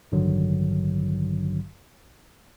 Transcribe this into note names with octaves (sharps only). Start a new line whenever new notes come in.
A1 G2 D3 D#3 F#3